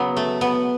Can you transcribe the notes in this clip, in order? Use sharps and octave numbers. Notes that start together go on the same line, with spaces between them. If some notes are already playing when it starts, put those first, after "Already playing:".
Already playing: C#3 F#3 B3
A3
B3